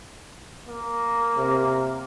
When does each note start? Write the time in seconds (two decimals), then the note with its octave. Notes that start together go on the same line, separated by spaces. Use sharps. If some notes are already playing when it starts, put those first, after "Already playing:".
0.68 A#3
1.38 C3